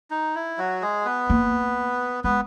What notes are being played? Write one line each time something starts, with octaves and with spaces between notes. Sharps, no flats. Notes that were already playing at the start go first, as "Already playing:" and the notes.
D#4
E4
F#3 F#4
G#3 G#4
B3 B4
A#3
G#3 B3 B4